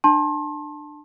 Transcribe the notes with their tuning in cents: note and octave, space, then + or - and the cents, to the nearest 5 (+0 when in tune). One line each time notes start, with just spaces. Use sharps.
D4 +25 A5 +0 C6 +35